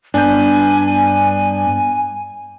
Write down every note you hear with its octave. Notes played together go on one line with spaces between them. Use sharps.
G2 B3 D4 G#5 G6